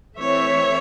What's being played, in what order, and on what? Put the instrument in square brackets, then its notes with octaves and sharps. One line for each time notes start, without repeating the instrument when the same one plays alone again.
[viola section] E3 A3 C4 C#5 E5